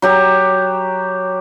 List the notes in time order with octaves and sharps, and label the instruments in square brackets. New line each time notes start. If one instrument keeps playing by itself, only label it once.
[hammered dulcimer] F#3 G4 A#5